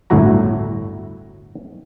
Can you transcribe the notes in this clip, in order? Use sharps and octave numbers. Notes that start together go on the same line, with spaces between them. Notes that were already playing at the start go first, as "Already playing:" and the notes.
G1 D2 A2 E4 F#4 A#5